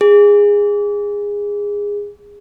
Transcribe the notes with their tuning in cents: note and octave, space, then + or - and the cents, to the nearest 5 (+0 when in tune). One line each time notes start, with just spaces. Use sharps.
G#4 -20